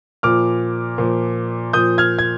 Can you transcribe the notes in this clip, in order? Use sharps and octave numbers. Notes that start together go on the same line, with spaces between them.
A#2 F3 D6 F6
A#2 F3
A#2 F3 D#6 G6
F6 G#6
G#6